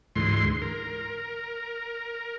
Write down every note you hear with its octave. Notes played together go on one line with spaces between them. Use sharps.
D2 G#2 E3 C6
A#4